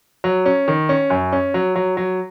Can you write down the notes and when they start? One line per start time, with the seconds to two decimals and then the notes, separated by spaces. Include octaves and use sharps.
0.24 F#3
0.46 C#4
0.68 D#3
0.89 C#4
1.10 F#2
1.32 C#4
1.54 F#3
1.75 F#3
1.97 F#3